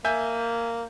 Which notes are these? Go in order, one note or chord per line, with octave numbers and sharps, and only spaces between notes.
A#3 E5 G#5 G6